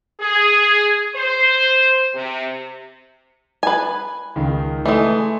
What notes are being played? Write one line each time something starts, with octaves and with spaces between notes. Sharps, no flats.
G#4
C5
C3
B4 G#5
C#2 D#3
E3 G#3 A3